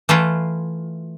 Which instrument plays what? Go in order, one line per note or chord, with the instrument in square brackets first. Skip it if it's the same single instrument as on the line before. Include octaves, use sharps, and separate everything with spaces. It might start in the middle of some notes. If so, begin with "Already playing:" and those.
[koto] E3 A3 E4 F4